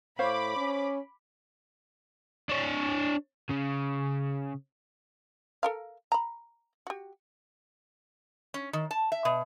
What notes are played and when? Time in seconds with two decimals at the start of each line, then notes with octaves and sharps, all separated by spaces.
0.19 A2 C5 C#5 F5 B5 D6
0.56 C#4
2.49 D4 C#5
3.50 C#3
5.63 A4 A#4 F5
6.12 A#5 B5
6.87 F#4 G4
8.54 C#4
8.73 D#3
8.91 A5
9.12 E5
9.25 B2